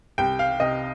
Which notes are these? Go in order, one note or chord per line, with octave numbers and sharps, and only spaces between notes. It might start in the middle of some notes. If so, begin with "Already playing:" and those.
C2 G5
F5
C3 D#5